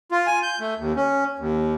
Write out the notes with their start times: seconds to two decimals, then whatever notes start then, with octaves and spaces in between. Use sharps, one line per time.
0.12 F4
0.27 G#5
0.43 G6
0.60 A3
0.78 D#2
0.96 C#4
1.39 D#2